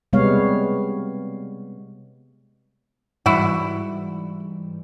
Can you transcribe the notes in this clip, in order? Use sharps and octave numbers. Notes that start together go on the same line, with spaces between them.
C3 G3 G#3 B3 C#5 F5
G#2 E3 G3 E4 F#4